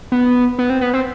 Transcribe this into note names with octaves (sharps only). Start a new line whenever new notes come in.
B3
B3
C4
B3
C4